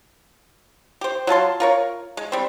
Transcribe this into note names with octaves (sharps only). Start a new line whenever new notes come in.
G4 C5
F#3 F4 A5 C6
F4 A#4 C#5
G#3
G3 C4